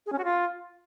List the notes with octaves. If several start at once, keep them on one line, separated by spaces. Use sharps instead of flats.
G#4
C#4
F#4
F4